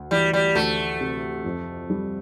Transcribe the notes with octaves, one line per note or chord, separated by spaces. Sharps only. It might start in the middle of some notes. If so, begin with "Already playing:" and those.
Already playing: D2
E3 G3
G3
D2 A3
C3
F2
G3